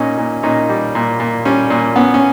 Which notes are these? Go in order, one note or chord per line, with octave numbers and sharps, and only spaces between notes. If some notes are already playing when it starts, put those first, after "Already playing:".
Already playing: A#2 C#4 D#4
A#2
A#2 C#4 D#4
G3
A#2
A#2
G3 C#4
A#2
B3 C#4
C#4